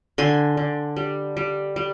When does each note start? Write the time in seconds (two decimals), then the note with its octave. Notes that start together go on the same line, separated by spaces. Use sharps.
0.18 D3 G#5 C6
0.57 D3
0.96 G3
1.37 G3
1.76 G3